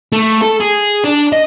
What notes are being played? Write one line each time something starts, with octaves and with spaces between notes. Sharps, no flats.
A3
A4
G#4
D4
D#5